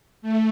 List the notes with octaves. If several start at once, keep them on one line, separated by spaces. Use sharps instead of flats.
A3